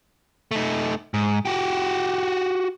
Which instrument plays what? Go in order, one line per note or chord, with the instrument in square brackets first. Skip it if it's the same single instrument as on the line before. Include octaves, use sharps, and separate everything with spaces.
[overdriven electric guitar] A3 D#4
G#2
F#4 G4